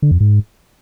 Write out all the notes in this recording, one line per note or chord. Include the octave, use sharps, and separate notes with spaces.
D3
F2
G#2